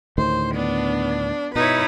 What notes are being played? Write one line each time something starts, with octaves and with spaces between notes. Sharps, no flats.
D2 A2 D#3 C5
B3 D4
B2 D#4 E4 B4 C#5